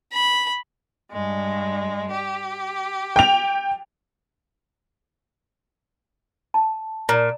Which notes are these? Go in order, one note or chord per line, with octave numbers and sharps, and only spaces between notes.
B5
G2 G#3
G4
G5 F7
A5
A#2 A#5